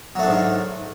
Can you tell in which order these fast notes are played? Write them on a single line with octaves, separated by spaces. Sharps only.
F#3 A3 D4 G#2 D#3